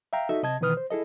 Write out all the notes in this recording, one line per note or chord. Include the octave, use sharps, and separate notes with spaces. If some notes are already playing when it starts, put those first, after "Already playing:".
E5 F5 G5 A#5
D#4 F#4 A4 D#5 E5
C3 D#5 A5 G#6
B2 D#3 E3 B4 D#6 F6
C5
E4 G#4 A4 D#5